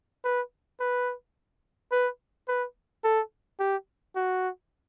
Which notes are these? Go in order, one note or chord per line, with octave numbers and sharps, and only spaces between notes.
B4
B4
B4
B4
A4
G4
F#4